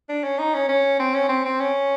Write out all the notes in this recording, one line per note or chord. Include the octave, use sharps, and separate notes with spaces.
D4
C#4
D#4
C#4
C#4
C4
C#4
C4
C4
C#4